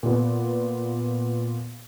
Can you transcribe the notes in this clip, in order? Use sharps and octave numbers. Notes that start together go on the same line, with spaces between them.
A#2 B3